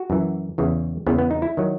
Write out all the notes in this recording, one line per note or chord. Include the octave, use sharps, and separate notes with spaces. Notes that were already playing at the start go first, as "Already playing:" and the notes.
Already playing: F#4
F#2 E3
E2 C#3 E3
E2 C#3 E3 B3
B3
D#4
E4
D#3 F#3